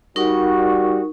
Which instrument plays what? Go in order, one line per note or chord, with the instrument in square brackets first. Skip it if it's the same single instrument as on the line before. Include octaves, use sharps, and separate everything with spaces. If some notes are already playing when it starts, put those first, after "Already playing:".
[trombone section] G3 F#4 [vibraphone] D#4 A#4 C#6